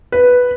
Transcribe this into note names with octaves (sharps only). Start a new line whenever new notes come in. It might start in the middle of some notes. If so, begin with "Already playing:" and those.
B4